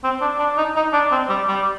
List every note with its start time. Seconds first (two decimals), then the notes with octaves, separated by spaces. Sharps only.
0.04 C4
0.21 D4
0.39 D4
0.58 D#4
0.76 D#4
0.93 D4
1.12 C4
1.29 G3
1.48 G3